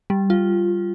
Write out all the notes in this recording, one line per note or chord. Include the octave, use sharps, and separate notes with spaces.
G3
F4